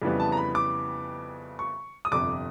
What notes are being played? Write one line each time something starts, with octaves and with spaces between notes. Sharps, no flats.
F2 C#3 E3 G3 B3
A5
A#5
B5
D6
C#6
D#6
G1 F2 C3 D6